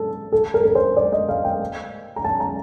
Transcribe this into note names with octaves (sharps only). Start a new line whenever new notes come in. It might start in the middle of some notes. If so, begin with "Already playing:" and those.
Already playing: A4
A4
A#4
A#4
C5
D5
D#5
F5
G5
A#5
A5
A#5